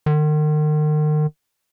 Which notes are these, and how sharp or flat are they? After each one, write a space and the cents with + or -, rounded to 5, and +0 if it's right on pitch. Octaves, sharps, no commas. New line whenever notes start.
D#3 -40